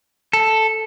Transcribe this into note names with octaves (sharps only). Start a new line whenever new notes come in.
A4